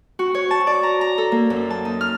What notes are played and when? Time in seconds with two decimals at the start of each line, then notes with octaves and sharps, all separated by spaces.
0.19 F#4
0.34 C#5
0.51 A5
0.67 D5
0.83 A#5
1.01 A#5
1.18 A4
1.32 A#3
1.50 F#2
1.70 A5
1.85 D#4
2.01 F6